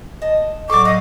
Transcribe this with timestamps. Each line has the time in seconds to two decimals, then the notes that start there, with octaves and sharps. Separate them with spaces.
0.22 D#5 A5
0.70 A2 F#3 A4 D5 D6
0.85 D#5 F5 F#5